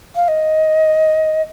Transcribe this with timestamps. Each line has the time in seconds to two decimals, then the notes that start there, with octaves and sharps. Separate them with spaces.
0.15 F5
0.28 D#5